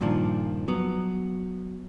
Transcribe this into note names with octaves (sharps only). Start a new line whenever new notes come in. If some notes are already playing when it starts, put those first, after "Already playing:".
G2 A#2 D#3 F3 D4
F#3 B3